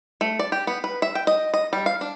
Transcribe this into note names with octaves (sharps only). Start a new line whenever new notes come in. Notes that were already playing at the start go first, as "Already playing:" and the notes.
A3
D5
G4
B3
B4
E5
G5
D#5
D#5
G3
F5
D4